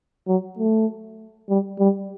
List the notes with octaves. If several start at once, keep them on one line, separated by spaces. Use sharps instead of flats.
F#3
A3
G3
G3